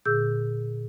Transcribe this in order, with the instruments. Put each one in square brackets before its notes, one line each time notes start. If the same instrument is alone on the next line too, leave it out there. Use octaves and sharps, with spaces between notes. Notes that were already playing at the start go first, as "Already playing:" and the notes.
[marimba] A#2 D3 G#4 E6 G6